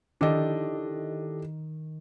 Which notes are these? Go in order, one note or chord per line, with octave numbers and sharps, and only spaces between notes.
D#3 D4 E4 G4 A4 D#5